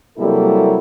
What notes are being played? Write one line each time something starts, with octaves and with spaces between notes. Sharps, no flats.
C3 F#3 G3 A#3 E4 A4